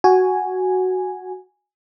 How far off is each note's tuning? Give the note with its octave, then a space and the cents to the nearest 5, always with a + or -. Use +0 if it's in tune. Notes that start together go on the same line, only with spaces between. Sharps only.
F#4 +0 G#5 -5